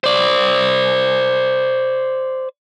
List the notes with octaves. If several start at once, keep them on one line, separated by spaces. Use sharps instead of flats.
C5 D5